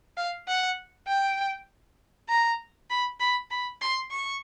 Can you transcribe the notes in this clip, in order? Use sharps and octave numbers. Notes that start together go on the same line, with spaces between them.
F5
F#5
G5
A#5
B5
B5
B5
C6
C#6